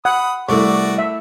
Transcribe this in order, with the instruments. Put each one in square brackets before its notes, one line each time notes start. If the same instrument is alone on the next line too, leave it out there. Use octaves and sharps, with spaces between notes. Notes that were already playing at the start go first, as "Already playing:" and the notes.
[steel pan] F#5 [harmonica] B5 D#6
[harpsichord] C2 [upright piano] A3 E4 [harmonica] F#4 D5
[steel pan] E5